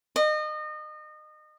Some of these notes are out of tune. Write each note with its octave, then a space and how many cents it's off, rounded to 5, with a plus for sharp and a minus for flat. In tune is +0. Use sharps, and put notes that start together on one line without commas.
D#5 -30